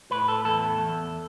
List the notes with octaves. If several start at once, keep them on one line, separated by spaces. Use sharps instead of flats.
A2 B4
A4
E2 A4
E2